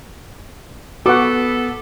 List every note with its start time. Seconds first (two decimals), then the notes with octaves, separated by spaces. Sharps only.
1.06 B3 F#4 A4 B4 F#5 D6